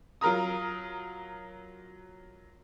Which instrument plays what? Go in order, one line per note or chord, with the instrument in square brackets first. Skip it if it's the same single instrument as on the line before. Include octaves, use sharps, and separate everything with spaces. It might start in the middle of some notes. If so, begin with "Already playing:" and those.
[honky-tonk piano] F#3 F4 A#4 A#5 D#6